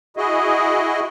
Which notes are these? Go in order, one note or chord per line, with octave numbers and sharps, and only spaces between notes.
E4 F#4 G#4 D#5